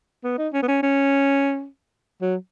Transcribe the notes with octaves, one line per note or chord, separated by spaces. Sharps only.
B3
D#4
C#4
B3
C#4
C#4
F#3